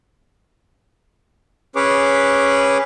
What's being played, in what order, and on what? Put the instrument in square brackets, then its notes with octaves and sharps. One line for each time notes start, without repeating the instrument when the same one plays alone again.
[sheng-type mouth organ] C#4 G#4 B4 C#5 D6